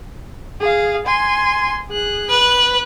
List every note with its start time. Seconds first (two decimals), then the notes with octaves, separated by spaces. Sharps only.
0.60 G#4 F5
1.06 G#5 C6
1.89 G#4 F#6
2.30 B4 F#6